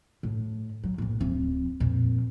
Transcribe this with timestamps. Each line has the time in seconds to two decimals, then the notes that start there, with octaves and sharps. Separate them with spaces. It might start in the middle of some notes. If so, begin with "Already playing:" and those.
0.23 A2
0.83 F#3
0.98 A#1 A2
1.20 D1 F2
1.80 F2 A#2